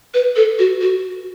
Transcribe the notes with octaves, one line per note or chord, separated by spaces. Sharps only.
B4
A4
F#4
F#4